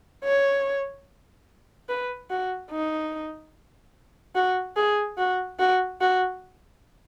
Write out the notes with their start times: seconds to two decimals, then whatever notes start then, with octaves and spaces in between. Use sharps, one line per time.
0.25 C#5
1.89 B4
2.30 F#4
2.71 D#4
4.35 F#4
4.77 G#4
5.18 F#4
5.59 F#4
6.01 F#4